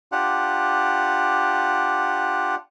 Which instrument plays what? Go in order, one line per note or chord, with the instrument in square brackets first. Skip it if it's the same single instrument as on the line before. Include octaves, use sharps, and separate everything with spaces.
[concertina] D4 F4 G4 F#5